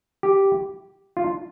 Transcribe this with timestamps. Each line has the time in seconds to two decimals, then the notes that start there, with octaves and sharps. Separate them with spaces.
0.23 G4
1.17 F4